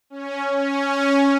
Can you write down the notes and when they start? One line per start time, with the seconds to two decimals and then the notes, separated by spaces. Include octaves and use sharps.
0.10 C#4
0.56 C#4